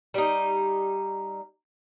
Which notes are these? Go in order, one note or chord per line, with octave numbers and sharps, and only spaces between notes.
G3 D#4